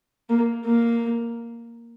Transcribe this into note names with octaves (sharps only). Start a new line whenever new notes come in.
A#3
A#3